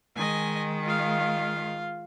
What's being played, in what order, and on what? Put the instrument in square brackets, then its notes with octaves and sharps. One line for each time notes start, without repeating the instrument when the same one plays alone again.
[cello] D#3 G#3 [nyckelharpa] D#5 G#5
[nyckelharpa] F4 F5